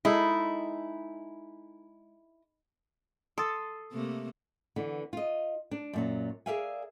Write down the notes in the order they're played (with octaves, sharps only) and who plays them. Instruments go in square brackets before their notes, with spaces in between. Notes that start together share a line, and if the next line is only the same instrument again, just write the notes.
[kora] G#3 D#4 A4 [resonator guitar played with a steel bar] E4
[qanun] A4 [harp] C6 D#6 A6
[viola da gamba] C3 A3 A#3
[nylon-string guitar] D3 E3 B3
F4 D#5
D4
F#2 A#2 F#3
G#4 A#4 D5 E5 F5 G#5